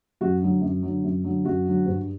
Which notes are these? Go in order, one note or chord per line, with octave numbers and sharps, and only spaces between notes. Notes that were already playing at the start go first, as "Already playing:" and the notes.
F#2 F#4
D3 F#3
F#2
D3 F#3
F#2
D3 F#3
F#2 F#4
D3 F#3
G2